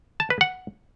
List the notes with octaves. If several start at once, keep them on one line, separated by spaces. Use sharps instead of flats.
A5
B4
F#5